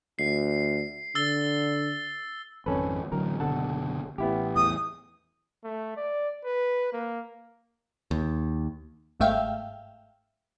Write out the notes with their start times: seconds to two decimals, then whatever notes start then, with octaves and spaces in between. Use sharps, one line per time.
0.19 D2 C7
1.15 D3 E6 A6 G7
2.66 G#1 F2 C#3 C#4 A4 B4
3.12 A1 D3 F#3 A#4
3.40 F#1 B2 D3 A4 F#5 A5
4.18 A1 B3 E4 G4
4.56 E2 A2 D#6
5.64 A3
5.97 D5
6.45 B4
6.93 A#3
8.11 D#2
9.20 G1 G#2 A3 E5 F5 G5